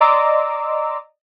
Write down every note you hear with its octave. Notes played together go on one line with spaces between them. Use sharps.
D5 D#5 A#5 C6 D6 E6